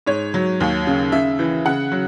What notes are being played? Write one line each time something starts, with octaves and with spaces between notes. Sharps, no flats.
G#2 C#5
F#3
D#2
C#3
C#3 E5
E3
C#3 F#5
F#3